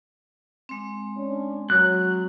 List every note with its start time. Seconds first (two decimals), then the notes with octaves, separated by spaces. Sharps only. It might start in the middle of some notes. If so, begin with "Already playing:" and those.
0.69 G#3 C4
1.16 C#4 D4
1.70 F#3 F#6